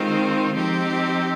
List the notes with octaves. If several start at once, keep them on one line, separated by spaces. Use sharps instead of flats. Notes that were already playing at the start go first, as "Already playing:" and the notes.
Already playing: D#3 G#3 C4 F4 C5
F3 C4 D#4 G4